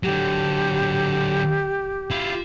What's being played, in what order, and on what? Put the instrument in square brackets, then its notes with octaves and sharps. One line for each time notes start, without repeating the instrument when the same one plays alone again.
[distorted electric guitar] D3 F#3 [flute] G4
[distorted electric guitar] E4 F4